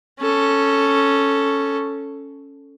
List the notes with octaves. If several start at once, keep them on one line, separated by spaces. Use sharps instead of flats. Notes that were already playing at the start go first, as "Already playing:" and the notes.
C#4 A4